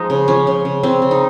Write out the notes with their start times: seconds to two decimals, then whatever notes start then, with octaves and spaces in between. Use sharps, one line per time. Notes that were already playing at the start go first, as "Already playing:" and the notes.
Already playing: F3 G#3 D#4
0.10 C#3
0.28 F3 C#4
0.47 C#3
0.65 C#3
0.83 C#3 C4
1.02 C#3
1.11 D#4